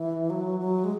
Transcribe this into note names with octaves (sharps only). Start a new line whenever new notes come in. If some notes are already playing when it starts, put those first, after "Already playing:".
Already playing: E3
F#3
F#3
G#3